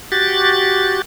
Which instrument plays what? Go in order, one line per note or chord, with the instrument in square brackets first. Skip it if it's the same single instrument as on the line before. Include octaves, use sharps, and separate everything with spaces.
[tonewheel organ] F#4 G4 A6